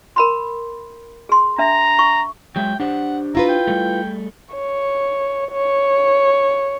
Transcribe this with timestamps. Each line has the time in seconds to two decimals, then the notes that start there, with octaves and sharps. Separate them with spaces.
0.16 A#4 B5 C6
1.29 G#4 C6
1.58 D4 E5 A#5
1.99 C#6
2.56 F#3 G#3 E5 G5
2.80 D4 G4 C5 F#5
3.35 E4 F4 B4 A#5
3.49 G5
3.67 G3 A3
4.55 C#5
5.52 C#5